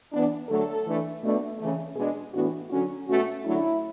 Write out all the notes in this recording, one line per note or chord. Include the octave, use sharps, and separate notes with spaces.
E3 B3 D4
D3 F#3 A3 A4
E3 A3 D4
B2 A3 D4
C#3 E3 A3
B2 G#3 D4 G#4
A2 E3 B3 D4 F#4
D3 F#3 C#4 F#4
B2 A3 C#4 F#4
D3 F#3 A3 D4 E4